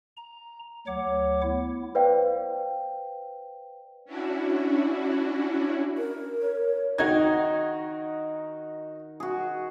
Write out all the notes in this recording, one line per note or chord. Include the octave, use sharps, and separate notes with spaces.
A#5
D2 F#3 C#5 F#5 D6
B3 E4
B4 C5 D5 F5 G5
C#4 D4 E4 F#4
A#4
C#5
D#3 D#4 F#4 G#6
F#4 G#4